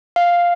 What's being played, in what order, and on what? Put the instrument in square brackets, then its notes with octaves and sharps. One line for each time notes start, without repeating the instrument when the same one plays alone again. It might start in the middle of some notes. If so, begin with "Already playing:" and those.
[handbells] F5